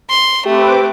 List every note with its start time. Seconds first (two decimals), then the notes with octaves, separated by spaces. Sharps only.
0.10 C6
0.46 A3 C4 G4 B4 D6